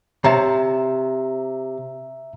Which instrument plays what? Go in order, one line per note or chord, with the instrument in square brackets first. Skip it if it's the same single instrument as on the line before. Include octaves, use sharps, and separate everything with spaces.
[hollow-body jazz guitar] C3 C#5 A5 [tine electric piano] E5 A#5